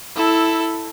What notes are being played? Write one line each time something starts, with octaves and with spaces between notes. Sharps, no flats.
E4 A4